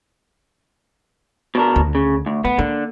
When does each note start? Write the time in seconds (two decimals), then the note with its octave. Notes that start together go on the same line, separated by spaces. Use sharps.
1.55 B2 D4 A#4
1.76 D2
1.95 C#3
2.26 D2
2.45 A3 B3
2.59 D3 A#3